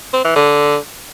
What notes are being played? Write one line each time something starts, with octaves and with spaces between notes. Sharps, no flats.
C4
E3
D3